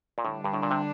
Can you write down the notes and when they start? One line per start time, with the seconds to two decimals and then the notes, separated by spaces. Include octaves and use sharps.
0.18 A#2
0.25 A2 D3 G3 D4
0.44 G2
0.53 A2
0.62 A#2
0.71 C3